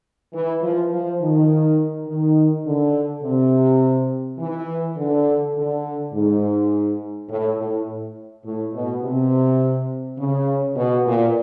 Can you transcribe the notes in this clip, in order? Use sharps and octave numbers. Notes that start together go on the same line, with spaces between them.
E3
F3
F3
D#3
D#3
D3
C3
E3
D3
D3
G#2
A2
A2
A2
B2
C3
C#3
B2
A#2